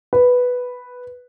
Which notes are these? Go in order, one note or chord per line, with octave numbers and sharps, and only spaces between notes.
B4